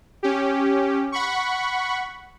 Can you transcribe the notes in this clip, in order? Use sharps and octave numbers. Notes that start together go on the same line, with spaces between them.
C#4 G4
F#5 B5 C#6